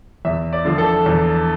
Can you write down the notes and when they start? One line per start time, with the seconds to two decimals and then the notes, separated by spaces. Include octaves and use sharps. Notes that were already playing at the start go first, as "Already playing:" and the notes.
0.25 E2 E5
0.53 D5
0.65 D3 F3
0.78 A4
1.06 E2